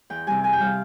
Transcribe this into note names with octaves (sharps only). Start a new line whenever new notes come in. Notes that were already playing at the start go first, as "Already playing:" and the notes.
E2 G5
C3 G3 G#5
E2 G#5
G5
C3 G3 F5